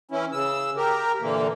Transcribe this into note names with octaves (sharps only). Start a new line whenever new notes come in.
E3 C#4 E4
C#3 E6
G4 A#4
A#2 D3 E3 A#3